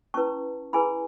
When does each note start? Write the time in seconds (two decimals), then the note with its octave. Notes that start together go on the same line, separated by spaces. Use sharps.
0.14 C#4 E4 B4 A5 C#6
0.73 E4 G#4 B4 G#5 B5